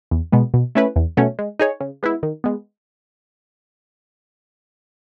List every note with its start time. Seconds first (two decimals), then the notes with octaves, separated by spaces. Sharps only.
0.11 E2
0.32 B2 G#3 B3
0.54 B2
0.75 A3 C#4 E4 B4
0.96 E2
1.17 B2 F#3 A3 C#4
1.39 G#3
1.59 D#4 G#4 C#5
1.80 C#3
2.03 G#3 B3 E4
2.23 D#3
2.44 G#3 B3